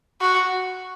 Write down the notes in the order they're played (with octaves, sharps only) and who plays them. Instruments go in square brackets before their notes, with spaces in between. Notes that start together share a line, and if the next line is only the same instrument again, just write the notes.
[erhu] F#4